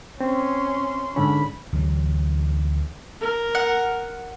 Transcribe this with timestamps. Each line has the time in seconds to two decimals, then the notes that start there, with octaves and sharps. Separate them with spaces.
0.21 C4 C#4 C6
1.16 G#2 D3 C#4 B5
1.73 D2 E3 F#3
3.21 A#4
3.55 F#5